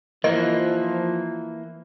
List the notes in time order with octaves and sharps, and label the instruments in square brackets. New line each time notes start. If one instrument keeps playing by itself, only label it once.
[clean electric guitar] E3 A#3 [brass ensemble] F3 [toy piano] D#5